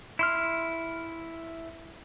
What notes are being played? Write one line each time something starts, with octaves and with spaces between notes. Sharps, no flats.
E4 C6 F6